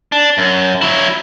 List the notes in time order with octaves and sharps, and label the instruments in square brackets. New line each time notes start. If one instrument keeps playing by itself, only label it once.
[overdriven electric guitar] D4
F#2
F#3 E4